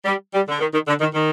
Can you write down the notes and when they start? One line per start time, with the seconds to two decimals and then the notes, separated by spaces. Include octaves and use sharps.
0.05 G3
0.32 G3
0.48 D3
0.60 D#3
0.72 D#3
0.87 D3
1.00 D#3
1.14 D#3